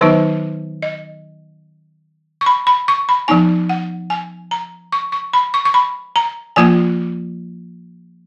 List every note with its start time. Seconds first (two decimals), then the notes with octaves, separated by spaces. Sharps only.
0.01 D#3 F#3 B3 D#4 B4
0.82 D#5
2.41 C#6
2.46 B5
2.67 B5
2.88 C#6
3.09 B5
3.28 F3 B3 D#4 G#5
3.69 F#5
4.10 G#5
4.51 A#5
4.92 C#6
5.12 C#6
5.33 B5
5.54 C#6
5.65 C#6
5.74 B5
6.16 A#5
6.56 F3 A#3 F4 G#5